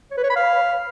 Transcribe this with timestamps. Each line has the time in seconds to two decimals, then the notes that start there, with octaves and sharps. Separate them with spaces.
0.11 C#5
0.17 B4
0.23 C#5
0.30 B5
0.36 F5